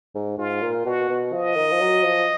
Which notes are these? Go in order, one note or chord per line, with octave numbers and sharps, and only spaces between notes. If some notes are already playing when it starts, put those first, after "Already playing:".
G#2
G#2 F4
A#2
B2 F#4
B2
F3 D#5
D#3
F3
F#3
F3